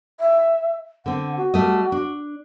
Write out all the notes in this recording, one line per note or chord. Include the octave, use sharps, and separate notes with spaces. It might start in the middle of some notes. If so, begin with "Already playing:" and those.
E5
D3 C4 F#5
F#4
G3 A3 D#5
D4